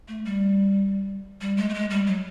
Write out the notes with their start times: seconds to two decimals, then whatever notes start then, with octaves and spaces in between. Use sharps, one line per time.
0.08 A3
0.25 G3
1.41 G3
1.57 G#3
1.69 A3
1.74 G#3
1.90 G3
2.07 F#3